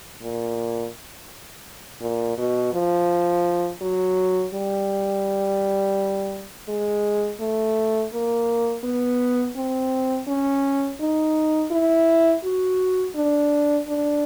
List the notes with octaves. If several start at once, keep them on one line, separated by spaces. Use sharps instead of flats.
A#2
A#2
B2
F3
F#3
G3
G#3
A3
A#3
B3
C4
C#4
D#4
E4
F#4
D4
D4